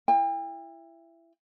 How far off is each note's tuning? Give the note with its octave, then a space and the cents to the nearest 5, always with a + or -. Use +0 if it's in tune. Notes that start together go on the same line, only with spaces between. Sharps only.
E4 +20 G5 +40